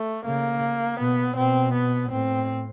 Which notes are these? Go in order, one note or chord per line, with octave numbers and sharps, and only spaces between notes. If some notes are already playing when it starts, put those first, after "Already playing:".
Already playing: A3
C#3 A#3
B2 B3
B2 C4
B3
A2 C4